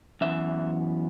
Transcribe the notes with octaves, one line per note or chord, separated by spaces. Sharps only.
F#2 E3 B3 E5